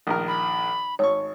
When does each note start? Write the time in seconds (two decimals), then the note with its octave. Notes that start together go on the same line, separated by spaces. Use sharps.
0.07 A#1 D#3 A#4
0.28 B5
0.99 G#1 C#5 C#6